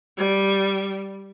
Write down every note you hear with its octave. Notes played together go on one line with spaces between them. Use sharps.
G3